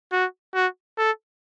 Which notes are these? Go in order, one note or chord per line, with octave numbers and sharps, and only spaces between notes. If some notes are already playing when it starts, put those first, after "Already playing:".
F#4
F#4
A4